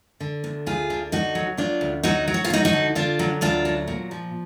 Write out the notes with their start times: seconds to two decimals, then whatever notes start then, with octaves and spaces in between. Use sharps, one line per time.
0.20 D3
0.44 D2
0.66 D2 F4 G#4
0.90 D3
1.12 D2 D#4 F#4
1.35 F#3
1.57 D2 D4 F4
1.81 D2
2.03 F#3 D#4 F#4
2.28 F#3
2.34 F#4
2.44 F4
2.50 D2 D#4 F#4
2.65 D#4 F#4
2.73 D3
2.95 D3 D4 F4
3.19 F#3
3.41 D2 D4 F4
3.65 F#3
3.88 A#2
4.11 F3